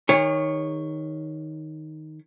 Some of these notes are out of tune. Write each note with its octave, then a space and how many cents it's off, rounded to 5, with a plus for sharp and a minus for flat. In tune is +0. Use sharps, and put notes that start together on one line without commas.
D#3 +0 G#4 -45 C#5 +0